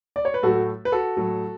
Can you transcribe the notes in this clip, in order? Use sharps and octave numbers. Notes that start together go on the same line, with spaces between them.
D5
C#5
B4
A2 F#3 A3 F#4 A4
B4
F#4 A4
A2 F#3 A3